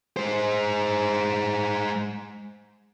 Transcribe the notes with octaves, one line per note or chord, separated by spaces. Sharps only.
G#3 C5